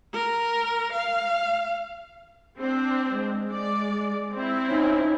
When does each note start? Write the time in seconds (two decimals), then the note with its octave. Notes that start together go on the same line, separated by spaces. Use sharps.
0.13 A#4
0.93 F5
2.59 C4 D4
3.09 G#3
3.52 G#3 D5
4.32 C4 E4
4.68 C#4 D#4